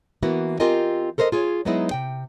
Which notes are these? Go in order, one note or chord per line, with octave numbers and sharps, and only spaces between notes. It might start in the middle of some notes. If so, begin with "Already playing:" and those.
E3 A#3 B3 E4 F#4
C4 F4 G4 A#4 D#5 G#5
A4 A#4 C5 C#5 D#5
F4 G#4 C#5
F#3 G#3 B3 D#4 E4 G#4
C3 G5